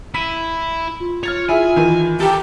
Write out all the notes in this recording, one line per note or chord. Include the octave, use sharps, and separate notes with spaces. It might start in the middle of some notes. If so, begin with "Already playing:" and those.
E4 B6 D#7
F4
C#5 F6 A6 F7
E4 G#4 E5 G#5
D#3 E3
G4 A4 A#4